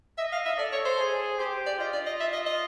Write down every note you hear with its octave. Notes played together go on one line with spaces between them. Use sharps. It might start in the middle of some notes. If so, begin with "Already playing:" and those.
D#5 E5
F5
E5
A4 D5
C#5
C5
G#4
G4 C5
D5
F4 D#5
D5
D#5
E5
D#5
D#5